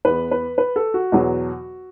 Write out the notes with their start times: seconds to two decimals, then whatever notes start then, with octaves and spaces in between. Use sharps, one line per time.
0.05 E2 E3 B3 B4
0.31 B4
0.58 B4
0.76 A4
0.94 F#4
1.12 E2 B2 F#3